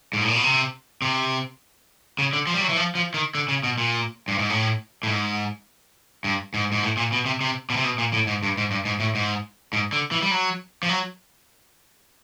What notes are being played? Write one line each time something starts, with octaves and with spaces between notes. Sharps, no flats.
G#2
A2
A#2
B2
C3
C3
C#3
D3
F3
G3
F#3
E3
F3
F3
D#3
D3
C#3
B2
A#2
G2
G#2
A2
A2
G#2
G2
G#2
G#2
A2
A#2
B2
C3
C3
B2
C3
B2
A#2
A2
G#2
G2
G#2
G2
G#2
A2
G#2
G#2
D3
E3
G3
F#3
F3
F#3